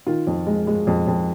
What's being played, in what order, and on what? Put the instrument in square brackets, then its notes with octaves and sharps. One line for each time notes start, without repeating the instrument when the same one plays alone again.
[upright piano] D#3 F4
F2
G#3
G#3
F2
F2